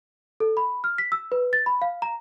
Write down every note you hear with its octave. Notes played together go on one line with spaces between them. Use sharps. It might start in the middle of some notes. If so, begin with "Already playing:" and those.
A4
B5
F6
B6
E6
B4
A6
B5
F5
A#5